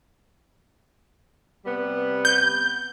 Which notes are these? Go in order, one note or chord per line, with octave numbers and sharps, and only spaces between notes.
C3 G3 B3
G6